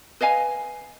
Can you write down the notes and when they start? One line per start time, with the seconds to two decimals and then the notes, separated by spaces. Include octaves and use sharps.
0.21 B4 D#5 F5 G#5